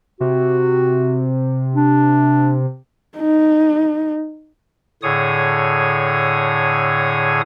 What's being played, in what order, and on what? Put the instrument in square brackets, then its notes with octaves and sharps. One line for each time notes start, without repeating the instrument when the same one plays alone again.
[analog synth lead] C3 [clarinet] F#4
[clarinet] D4
[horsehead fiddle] D#4
[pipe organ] A2 D3 G#4 C#5 D#6